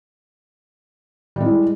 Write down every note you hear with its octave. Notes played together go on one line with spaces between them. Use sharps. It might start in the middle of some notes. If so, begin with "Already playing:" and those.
G3 G#3 E4